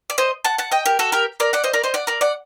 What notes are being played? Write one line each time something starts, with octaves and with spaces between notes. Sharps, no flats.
D5
C5 D#5
F#5 A5
F#5 A5
D#5 G5
G4 A#4
F#4 A4
G4 A#4
A#4 D5
D5 F#5
C5 D#5
A#4 D5
C5 D#5
D5 F#5
A#4 D5
D5 F#5